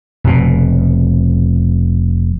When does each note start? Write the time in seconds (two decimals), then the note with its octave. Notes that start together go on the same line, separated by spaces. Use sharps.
0.24 F1 B2